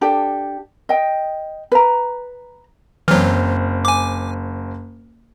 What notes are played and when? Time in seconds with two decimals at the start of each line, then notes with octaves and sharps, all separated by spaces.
0.01 D4 G4 A4
0.89 D#5 G5
1.72 B4 A#5
3.08 F#1 E3 F#3 C4 F6
3.85 G#5 D6